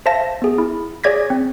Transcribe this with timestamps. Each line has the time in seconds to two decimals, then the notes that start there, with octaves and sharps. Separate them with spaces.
0.06 C5 E5 F5 A5 A#6
0.42 B3 G#4
0.58 E4
1.04 G#4 C#5 D5 G#6 A#6 B6
1.30 C4